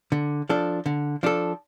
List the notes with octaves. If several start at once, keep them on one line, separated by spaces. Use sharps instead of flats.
D3
F3 D4 A4
D3
F3 D4 A4